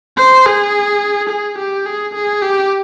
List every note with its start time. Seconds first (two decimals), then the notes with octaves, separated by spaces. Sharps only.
0.17 C5
0.46 G#4
1.30 G#4
1.58 G4
1.86 G#4
2.15 G#4
2.42 G4